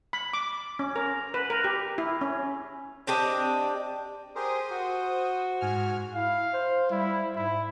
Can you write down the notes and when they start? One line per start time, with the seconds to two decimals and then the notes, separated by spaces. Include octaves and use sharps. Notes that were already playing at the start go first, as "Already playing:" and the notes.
0.13 B5
0.33 D6
0.79 C#4
0.96 A#4
1.34 B4
1.50 A#4
1.64 G4
1.98 E4
2.21 C#4
3.07 C4 D4 G4 D#5
4.35 G4 G#4 A#4 C5 D#6
4.71 F#4
5.60 G#2 G#5 F6
6.14 E4 F5
6.53 C5
6.91 G3 E4
7.36 G#2 E4